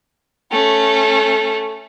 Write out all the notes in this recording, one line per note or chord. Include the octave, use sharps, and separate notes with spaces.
A3 C#4